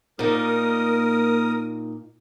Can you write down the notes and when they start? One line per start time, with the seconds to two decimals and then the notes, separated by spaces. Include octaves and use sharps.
0.19 A#2 A#3 D#4 A#4 D#6